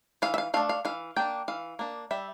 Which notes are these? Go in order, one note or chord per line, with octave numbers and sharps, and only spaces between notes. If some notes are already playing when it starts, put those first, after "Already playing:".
E3 F5
E5
F5
A3 D4 F5
F5
E3 F5
A#3 D4 G5
E3 F5
A#3 D4
G3 E5